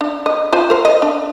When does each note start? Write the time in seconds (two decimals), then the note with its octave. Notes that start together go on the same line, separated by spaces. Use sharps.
0.01 D4
0.26 D#5
0.52 F4 C5 G#5
0.70 A#4 C5
0.85 D#5
1.02 D4